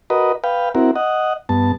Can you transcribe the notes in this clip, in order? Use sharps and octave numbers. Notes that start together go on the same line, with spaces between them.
F#4 A#4 B4 D#5
B4 F5 G5
C4 E4 F#4 A#4
D#5 F#5
G2 B3 A5